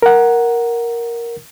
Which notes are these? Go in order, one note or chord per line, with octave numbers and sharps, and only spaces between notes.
A#4 F#5